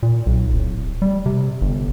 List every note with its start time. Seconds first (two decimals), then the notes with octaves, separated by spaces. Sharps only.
0.03 A#2
0.26 B1
0.53 D1
1.02 G3
1.26 C3
1.61 G1